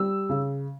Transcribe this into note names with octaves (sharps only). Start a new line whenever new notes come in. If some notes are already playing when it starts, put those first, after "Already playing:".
Already playing: G3 E6
C#3